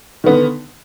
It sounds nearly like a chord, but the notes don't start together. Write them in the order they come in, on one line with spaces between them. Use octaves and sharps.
D#3 B3 D3